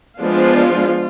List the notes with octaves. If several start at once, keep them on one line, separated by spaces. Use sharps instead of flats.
F3 G#3 B3 D4 F4